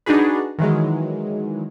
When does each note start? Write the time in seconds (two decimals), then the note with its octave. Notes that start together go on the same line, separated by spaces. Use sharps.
0.06 D4 D#4 F#4 G#4 B4
0.59 D#3 E3 F#3 G#3